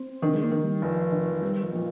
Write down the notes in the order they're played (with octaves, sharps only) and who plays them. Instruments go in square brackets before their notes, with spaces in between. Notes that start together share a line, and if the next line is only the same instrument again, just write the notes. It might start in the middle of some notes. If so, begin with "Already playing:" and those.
Already playing: [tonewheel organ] C4
[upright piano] D#3 [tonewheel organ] D4
[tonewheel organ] G#3
A#3
[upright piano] D#3
[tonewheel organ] G3
[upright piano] F1 [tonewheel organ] F3
[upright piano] D#3
[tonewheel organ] F3
[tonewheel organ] G3 [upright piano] C4
[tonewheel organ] F3
[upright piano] A#2 [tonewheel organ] F3